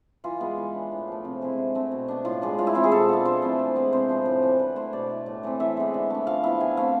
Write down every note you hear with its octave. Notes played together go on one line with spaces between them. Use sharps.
E3 F4
G#3 B3
E3
B3 D4
A2
F3 A3
C3
G#3 C4 E4
D3
A3 C4
B2
B3 D4
A2 F4
G#3 D4
A2 F4
E4
E3 G#3 C4 F4
G#4
B2 A4
B3 D4
F3 C5
A3 C4 E4
E3
G#3 B3
C3 C5
F3 A3 C4
A2
E3 B3 D4
D3 B4
A3 E4 C5
B2 D5
A3 E4
A2
E3 A3 C4
E3 E5
G#3 B3
D3
A3 D4
F3 F5
B3 E4
D3 G#5
A3 C4 F5